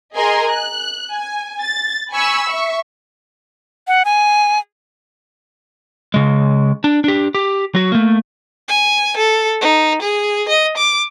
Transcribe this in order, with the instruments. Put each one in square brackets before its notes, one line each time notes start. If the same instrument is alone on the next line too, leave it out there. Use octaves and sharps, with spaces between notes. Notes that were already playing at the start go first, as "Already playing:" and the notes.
[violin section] G#4 A#4 D#5 G#5 C6
F#6
G#5
A6
G#5 B5 C#6 E6
E5 C#6
[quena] F#5
G#5
[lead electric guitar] C#3 G#3
D4
D4 G4
G4
F#3 F#4
A3 A#3
[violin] G#5
A4
D#4
G#4
D#5
D6